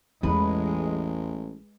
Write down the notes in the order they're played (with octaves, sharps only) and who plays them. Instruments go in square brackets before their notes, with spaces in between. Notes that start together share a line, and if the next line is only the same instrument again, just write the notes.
[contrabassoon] A1 [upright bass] E2 E3 [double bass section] G#3 [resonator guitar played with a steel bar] B4